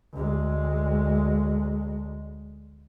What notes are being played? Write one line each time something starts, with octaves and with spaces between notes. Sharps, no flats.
D2 G#3